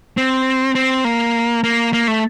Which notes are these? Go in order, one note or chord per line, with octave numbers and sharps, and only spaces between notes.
C4
C4
A#3
A#3
A#3
A3